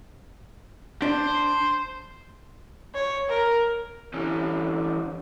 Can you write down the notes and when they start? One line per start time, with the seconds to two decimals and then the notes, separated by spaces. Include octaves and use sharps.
1.02 D4 C5
2.95 C#5
3.29 A#4
4.14 D3 E3 C#4